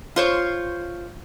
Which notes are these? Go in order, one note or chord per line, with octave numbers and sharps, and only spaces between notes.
F4 C5 C#5